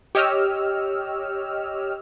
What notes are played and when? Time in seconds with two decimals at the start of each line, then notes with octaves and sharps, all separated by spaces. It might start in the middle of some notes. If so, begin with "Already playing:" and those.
0.15 G4 C#5 D#5 E6 F6